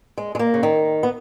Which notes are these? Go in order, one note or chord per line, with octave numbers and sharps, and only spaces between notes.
G#3
G#3
A#3
C#3
D#3
B3